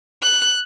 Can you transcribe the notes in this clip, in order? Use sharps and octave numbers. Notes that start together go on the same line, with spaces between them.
F#6